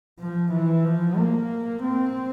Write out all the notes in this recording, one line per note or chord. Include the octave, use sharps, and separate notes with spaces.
F3
E3
F3
A#3
C4